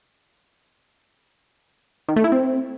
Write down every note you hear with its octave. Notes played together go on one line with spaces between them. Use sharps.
D#3
A3
E4
C4